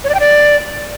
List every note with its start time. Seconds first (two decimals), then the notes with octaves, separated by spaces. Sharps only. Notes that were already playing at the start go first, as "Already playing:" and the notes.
0.04 C#5
0.09 D5
0.14 G5
0.20 D5